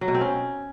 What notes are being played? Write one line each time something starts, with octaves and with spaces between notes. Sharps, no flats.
F#3
B2
C4
C#4